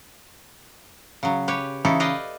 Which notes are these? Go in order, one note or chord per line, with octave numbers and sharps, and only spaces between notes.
C#3 F#3
G4 B4 C#5
C#3 E3 C#4 D#4 E4 A4
B4 D5 D#5 F5 G5